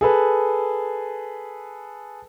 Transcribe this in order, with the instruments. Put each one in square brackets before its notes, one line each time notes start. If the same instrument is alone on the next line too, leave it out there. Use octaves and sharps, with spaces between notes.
[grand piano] G#4 A4 B4